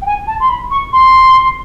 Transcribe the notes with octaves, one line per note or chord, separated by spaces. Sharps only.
G5
G#5
A5
C6
B5
C#6
C6